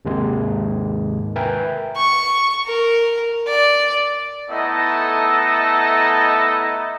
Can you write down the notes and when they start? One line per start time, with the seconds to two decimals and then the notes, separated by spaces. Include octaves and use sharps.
0.05 D#2 G#2 C3 D#3 G#3
1.36 A#4 B4 E5 G5 G#5
1.96 C#6
2.67 A#4
3.47 D5
4.49 A3 B3 D#4 E4 A4 D#5